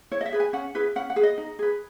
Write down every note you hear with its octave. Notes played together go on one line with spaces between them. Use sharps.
E4 C#5
D#5
E5
G#4 B4
G#5
C#4 F#5
E4 G#4 B4
C#4 F#5
F#5
G#4 B4
D#5
D#4
G#4 B4